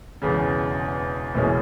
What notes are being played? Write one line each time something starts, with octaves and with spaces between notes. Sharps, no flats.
E1 E2 C#3
F#1 E2 B2 G#3 C#4